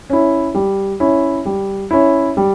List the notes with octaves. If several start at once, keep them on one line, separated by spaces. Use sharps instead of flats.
C#4 E4
G3
C#4 E4
G3
C#4 E4
G3